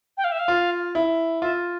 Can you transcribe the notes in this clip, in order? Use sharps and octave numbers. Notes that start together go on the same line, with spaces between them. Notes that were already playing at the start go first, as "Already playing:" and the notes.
G5
F5
E5
F5
F4
E4
F4 E5